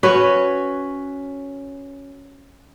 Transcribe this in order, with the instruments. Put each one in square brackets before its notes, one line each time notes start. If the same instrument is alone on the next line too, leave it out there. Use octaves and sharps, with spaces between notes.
[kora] C#4 F#4 B4 C#5